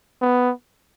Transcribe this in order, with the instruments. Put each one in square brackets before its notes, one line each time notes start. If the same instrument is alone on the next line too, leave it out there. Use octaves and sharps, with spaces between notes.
[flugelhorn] B3